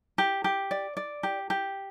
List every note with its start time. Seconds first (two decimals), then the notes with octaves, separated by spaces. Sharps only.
0.18 G4
0.44 G4
0.71 D5
0.97 D5
1.23 G4
1.50 G4